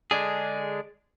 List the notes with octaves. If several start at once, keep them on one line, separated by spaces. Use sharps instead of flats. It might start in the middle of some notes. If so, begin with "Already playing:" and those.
D3 G#3 D4 G#4